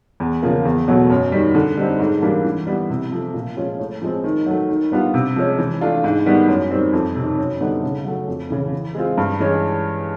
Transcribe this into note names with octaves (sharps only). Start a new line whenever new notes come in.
E2
C#3 F3 A#3
E2
B2 F#3 A3
F#2
D#3 G3
D3
G3 C4 D#4
G#2
E3 G3 A#3 D4
E3
G3 B3 E4
C3
F3 A3
A#2
F3 G#3 C#4 F4
A2
F3 G#3 C4
D#3
F#3 A3
D#3
G3 B3 D4 F4
C3
F3 G#3 C#4
E3
A3 D4 F4
G#2
D#3 G3 B3 E4
F#2
D#3 G3 C4
F2
C3 D#3
F#2
D3 G3 B3 D#4
C#3
F#3 A3
F2
C#3 E3
E3
G#3 C4 F4
G2
E3 G#3 C#4